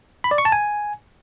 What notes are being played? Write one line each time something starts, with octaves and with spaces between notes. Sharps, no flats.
B5
D5
C#6
A5
G#5